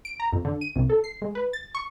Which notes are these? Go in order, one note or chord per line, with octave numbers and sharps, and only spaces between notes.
D7
A#5
F2
D3
D#7
C2
A4
C7
G#3
B4
A6
C#6